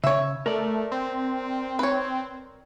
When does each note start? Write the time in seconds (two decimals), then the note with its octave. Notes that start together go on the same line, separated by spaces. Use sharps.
0.04 C#3 C#5 E5
0.46 A3 A#4 D5
0.92 C4
1.79 B4 C#5